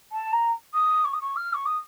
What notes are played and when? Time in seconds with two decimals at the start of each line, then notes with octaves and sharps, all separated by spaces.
0.12 A5
0.32 A#5
0.74 D#6
1.05 C#6
1.13 D#6
1.21 C#6
1.36 F6
1.54 C#6
1.66 D#6